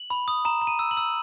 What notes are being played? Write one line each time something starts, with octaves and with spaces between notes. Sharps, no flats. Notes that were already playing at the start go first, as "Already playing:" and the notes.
Already playing: F#7
B5
D#6
A#5 E7
A#5
D#7
E6
F#7
E6